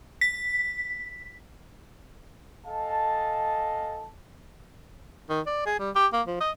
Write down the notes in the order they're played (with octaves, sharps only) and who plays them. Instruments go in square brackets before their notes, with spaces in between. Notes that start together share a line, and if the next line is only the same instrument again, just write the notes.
[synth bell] B6
[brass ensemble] A4 D#5 F5 G#5 A5
[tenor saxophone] D#3
D5
G#4
G3
G4
A#3
F3
D#5